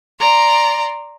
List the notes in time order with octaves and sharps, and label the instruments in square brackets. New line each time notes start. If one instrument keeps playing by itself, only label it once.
[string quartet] D5 A#5 C6